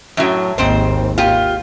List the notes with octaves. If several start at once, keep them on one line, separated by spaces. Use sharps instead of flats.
F#2 A2 F#3
G#1 D#2 G#2 C4 C5
F4 G4